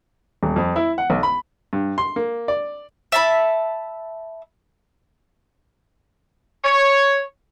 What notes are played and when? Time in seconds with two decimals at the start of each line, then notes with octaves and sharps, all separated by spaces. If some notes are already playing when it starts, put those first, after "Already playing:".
0.43 D#1
0.56 F2
0.76 E4
0.98 F#5
1.10 B1
1.23 B5
1.73 G2
1.98 C6
2.16 A#3
2.48 D5
3.12 E5 A5 B5
6.64 C#5